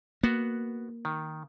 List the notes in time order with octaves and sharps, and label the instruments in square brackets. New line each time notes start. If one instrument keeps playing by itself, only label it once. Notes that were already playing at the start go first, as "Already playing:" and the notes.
[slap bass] A#3 [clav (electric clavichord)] B3 F#4
[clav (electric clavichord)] D#3